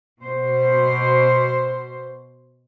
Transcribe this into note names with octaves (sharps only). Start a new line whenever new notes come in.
B2 C5